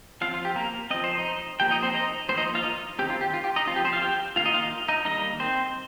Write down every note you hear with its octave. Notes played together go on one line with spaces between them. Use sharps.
F3 C4 F4 F5
F4
G4
A#3 A#4
F3 C4 D#5
C5
D#4 D#5
F3 A#3 G4 G5
D#4 D#5
C4 C5
D#4 D#5
F3 A#3 C4 C5
D#4 D#5
F4 F5
D#4 D#5
D#3 C4 G4
F4
G4
F4
G4
D#4 D#5
F3 C4 F4
G4
C4 C5
F4 F5
G4 G5
D#3 A#3 F4 F5
D#4 D#5
F4 F5
D#4 D#5
D#4 D#5
D#3 G3 A#3 D#4 D#5
C4 C5